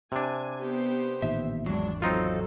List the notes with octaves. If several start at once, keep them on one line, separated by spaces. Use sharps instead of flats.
C3 D4 G#5
B3 G4 C5
A1 A#2 D#3 E5
G#1 E2 F#3 G#3 D4
F#3 C4 D#4 F4 A4